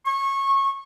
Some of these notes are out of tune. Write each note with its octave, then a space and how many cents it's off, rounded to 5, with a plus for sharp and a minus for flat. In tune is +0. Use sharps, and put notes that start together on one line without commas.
C#6 -20